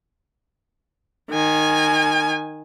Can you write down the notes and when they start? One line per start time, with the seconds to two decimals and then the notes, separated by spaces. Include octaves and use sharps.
1.31 D#3 G#5